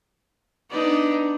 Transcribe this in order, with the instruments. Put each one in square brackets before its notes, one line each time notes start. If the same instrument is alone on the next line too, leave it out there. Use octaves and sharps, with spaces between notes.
[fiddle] B3 D4 [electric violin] D#4 D5